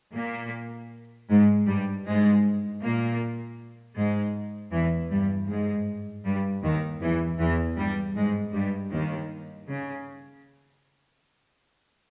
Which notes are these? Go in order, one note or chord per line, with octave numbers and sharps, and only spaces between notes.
A#2 A#3
G#2 G#3
G2 G3
G#2 G#3
A#2 A#3
G#2 G#3
E2 E3
G2 G3
G#2 G#3
G2 G3
D#2 D#3
E2 E3
E2 E3
G2 G3
G#2 G#3
G2 G3
D#2 D#3
C#3